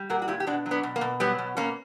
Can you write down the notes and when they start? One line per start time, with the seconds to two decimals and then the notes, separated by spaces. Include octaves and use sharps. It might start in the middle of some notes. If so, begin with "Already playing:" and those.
Already playing: G3
0.10 A#2 F#4 A#4
0.22 F#4
0.28 A#2 E4 G4
0.40 G4
0.47 B2 D4 F#4
0.66 F#3
0.71 B3 D4
0.83 B2
0.96 A#3
1.01 B2
1.20 F#3 G3 B3
1.38 B2
1.57 B2 A#3 C#4